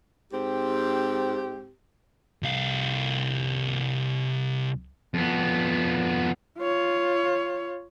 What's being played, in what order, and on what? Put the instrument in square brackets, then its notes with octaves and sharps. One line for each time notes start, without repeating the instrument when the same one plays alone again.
[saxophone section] G#2 C4 G4
[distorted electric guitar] C2 F5
F2 B3
[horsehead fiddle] F4 C#5